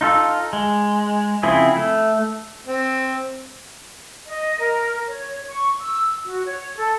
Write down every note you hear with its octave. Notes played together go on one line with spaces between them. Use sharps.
D#4 F4 A4
G#3
C#3 F3 C4 E4 G#4
A3
C4
D#5
A#4
C#5
C#6
E6
F#4
C#5
A4